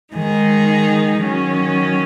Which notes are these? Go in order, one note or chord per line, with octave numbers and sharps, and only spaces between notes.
D#3 G#3 D#4 G#4
D#3 F#3 C#4